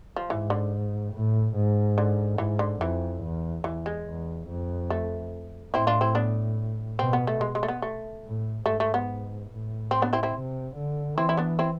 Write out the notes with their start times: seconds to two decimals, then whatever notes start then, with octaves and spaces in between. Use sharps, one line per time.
0.16 F3
0.30 G#2 E3
0.50 D3
1.13 A2
1.56 G#2
1.98 D3
2.38 G#2 E3
2.59 D3
2.81 F2 E3
3.23 E2
3.64 E2 E3
3.86 G#3
4.06 E2
4.48 F2
4.90 A3
5.73 A2 C4 E4
5.87 D4 F4
6.01 C4 E4
6.15 B3 D4
6.99 B2 C4
7.13 B3
7.27 A3
7.41 G#3
7.55 G#3
7.63 A3
7.68 B3
7.82 A3
8.25 A2
8.66 G#2 A3
8.80 A3
8.94 B3
9.49 A2
9.91 C4
10.02 B3 D4
10.13 C4 E4
10.23 C4 E4
10.34 C3
10.76 D3
11.17 E3 C4 E4
11.29 E4
11.37 B3 D4
11.59 C4 E4